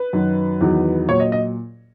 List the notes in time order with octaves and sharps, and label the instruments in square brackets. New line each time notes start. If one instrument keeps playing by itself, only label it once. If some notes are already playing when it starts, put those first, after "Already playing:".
Already playing: [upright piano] B4
F#2 D#3 F#3
E2 D#3 F#3
A#2 F#3 C#5
D#5
D#5